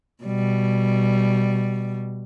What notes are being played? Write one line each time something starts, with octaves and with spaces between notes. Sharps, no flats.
B2 G3